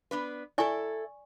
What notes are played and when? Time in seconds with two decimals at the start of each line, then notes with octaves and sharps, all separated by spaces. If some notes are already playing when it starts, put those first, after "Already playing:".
0.11 B3 D4 B4
0.58 E4 A4 D5 G#5 C#6